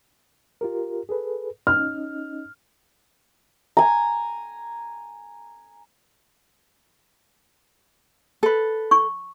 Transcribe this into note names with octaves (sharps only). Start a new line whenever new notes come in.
F4 G4 A#4
G#4 A4 B4
C#4 D#4 D#5 F6
G#5 A#5
A4 B4
C#6